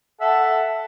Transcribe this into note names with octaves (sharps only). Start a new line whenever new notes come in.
A4 E5 F#5